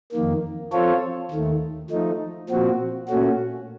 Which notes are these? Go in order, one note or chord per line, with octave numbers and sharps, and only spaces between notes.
F2 D#3 A#3
F3 C4 F4 A4 C#5
D#2 D#3 A3
F3 A3 D#4
A#2 F3 C4 F#4
A#2 A3 C#4 F#4